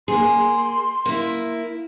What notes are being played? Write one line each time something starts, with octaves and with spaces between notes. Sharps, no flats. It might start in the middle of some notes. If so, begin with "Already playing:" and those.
A#3 G#4 C6
A#3 E4